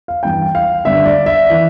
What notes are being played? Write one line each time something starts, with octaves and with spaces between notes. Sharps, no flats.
F5
G2 E3 G5
F5
G2 D3 E5
D5
E5
E3